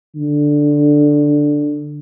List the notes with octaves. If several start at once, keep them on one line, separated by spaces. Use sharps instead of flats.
D3